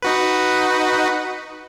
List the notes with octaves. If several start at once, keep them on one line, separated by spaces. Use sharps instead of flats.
D#4 F#4 B4